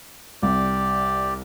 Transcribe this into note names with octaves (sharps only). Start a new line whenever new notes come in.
C2 G4 D5